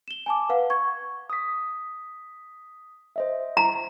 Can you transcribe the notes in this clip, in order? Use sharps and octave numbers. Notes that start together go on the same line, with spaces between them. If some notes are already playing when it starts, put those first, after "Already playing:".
E7 G7
G#5 A5 D6
B4 F5 F#5
C#6 G#6
D#6 B6
C5 D#5 E5
A#5